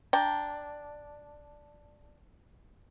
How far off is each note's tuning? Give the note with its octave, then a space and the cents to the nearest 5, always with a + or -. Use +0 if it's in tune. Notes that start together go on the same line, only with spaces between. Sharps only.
D4 +0 G5 +10 A#5 +5